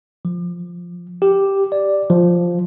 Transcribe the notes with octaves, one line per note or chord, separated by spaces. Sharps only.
F3
G4
D5
F3